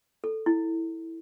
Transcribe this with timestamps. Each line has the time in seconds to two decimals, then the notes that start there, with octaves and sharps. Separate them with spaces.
0.24 A4
0.46 E4